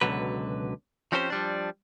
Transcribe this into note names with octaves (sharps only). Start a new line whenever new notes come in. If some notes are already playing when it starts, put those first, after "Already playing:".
C#2 G2 B2 D3 F#3 B4
F3 C4 C#4 G4 A4 C5
F3 G3 D4